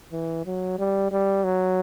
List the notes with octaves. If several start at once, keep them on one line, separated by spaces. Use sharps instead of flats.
E3
F#3
G3
G3
F#3